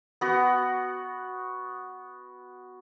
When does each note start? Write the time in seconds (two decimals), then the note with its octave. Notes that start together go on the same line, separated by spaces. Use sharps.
0.21 B3 F#4